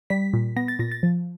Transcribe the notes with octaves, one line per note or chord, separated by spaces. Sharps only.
G3 B6
A#2
B3 A#6
A6
A#2 A#6
A6
F3